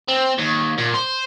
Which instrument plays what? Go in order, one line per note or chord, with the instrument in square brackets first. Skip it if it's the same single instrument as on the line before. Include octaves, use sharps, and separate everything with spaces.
[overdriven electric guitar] C4
D#2
A#2
C5